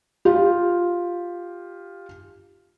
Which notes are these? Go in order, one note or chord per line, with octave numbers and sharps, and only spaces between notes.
F4 G4